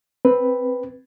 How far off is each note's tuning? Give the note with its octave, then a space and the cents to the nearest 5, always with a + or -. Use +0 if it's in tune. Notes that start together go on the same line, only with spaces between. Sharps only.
C4 +0 B4 +0